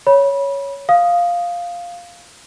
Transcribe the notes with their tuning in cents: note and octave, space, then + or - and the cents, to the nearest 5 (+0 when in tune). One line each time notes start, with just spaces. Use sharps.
C#5 +5 B5 -25
F5 +0 D#6 +0